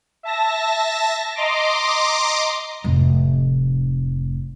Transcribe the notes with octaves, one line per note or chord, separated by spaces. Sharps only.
E5 A5 A#6
D#5 A#5 C6 D6
F1 A2